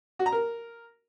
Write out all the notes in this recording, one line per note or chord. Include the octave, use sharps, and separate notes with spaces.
F#4
A#5
A#4